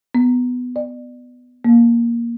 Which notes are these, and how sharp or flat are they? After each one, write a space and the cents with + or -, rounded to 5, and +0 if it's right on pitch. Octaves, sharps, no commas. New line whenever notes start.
B3 +10
D5 +30
A#3 +10